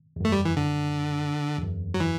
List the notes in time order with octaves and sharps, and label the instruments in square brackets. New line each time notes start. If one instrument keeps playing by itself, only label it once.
[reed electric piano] E2
[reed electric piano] F#2 [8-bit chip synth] A3
[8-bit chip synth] G3
E3
D3
[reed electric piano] E2
F#2
[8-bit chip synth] F#3
E3